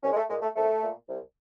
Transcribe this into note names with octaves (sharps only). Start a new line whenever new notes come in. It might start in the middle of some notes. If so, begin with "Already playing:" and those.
C2 C#4
G#3
A3
A#2 G#3
A3
C2 A3
A#2
C2